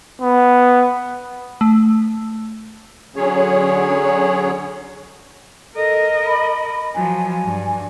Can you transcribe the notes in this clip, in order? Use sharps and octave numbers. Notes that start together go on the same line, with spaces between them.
B3
A3
D3 F#3 C#4 G#4 C#5
A4 A#4 D#5
B5
F3 F#3 G#5
G2